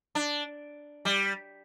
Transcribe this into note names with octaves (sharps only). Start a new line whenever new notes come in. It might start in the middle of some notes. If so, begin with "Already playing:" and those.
D4
G3